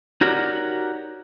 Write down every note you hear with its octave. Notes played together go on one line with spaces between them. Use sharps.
D#4 F#4 G4 A#4 C#5 D5